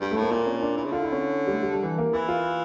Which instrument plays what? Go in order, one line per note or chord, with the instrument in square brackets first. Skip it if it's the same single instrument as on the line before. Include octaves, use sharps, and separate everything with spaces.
[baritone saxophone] G2 [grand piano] G3
[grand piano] A3
[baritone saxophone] A2 [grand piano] A#3
[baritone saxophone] A#2 [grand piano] A#3
[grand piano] C#4
D4
[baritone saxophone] A#2 [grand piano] E4
[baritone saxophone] C#3
[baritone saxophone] D3 [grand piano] F4
[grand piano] E4
C#4
G3
A3
G3
G3
E3
A#3
[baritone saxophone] E3 [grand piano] E4
[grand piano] F4